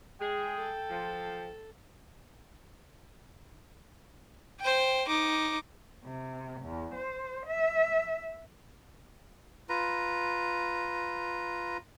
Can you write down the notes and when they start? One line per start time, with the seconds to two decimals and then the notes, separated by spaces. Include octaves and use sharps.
0.21 G#3 G#4 G5
0.55 A4
0.89 F3
4.60 C5 G5
5.08 D#4 D6
6.05 C3
6.63 E2
6.95 C5
7.47 E5
9.69 F4 B4 A#5